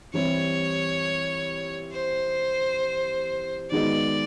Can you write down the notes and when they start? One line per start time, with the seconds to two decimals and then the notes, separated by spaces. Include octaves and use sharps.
0.13 E3 G3 C4 E4 G4 C#5
1.93 C5
3.71 D#3 G#3 B3 D#4 F#4 D5